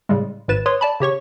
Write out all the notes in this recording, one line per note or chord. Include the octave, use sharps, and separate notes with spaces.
A2 C#3 G3 G#3
G#1 G#2 B4 A6 E7
B4 C#5 C6 D#6
D5 A5 B5
C#3 G4 C#5 C#6